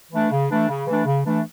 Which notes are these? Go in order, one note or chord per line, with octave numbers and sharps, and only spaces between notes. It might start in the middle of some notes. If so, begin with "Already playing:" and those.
E3 A3 D4
C#3
E3 A3 D4
C#3
E3 A3 D4
C#3
E3 A3 D4